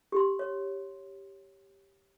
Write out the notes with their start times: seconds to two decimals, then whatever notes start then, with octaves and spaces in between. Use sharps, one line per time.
0.12 G4 C6
0.39 C#5